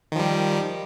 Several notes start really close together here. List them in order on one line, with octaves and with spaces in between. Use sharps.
D#3 F3 G3